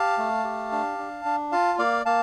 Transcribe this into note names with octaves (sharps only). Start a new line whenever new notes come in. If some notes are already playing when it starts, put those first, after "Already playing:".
Already playing: G4 F5 A5
A3
G4
D4
D4
D4
F4 F5 A5
A#3 D5 F5
A#3 F5 A5